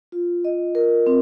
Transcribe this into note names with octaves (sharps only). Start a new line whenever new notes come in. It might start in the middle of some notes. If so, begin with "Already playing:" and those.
F4
D#5
A#4
C4